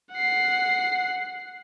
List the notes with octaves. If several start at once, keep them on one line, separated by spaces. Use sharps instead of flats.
F#5 C7